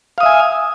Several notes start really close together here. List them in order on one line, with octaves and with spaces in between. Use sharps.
F5 D#6 E5 G#5